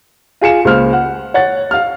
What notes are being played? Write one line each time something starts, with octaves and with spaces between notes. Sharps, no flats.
F4 G#4 C#7 E7
C#2 A#3 C5 F6
F#5
C#5 F#5 A6
F5 F6